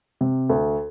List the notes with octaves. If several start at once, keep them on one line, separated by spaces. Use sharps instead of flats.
C3
D2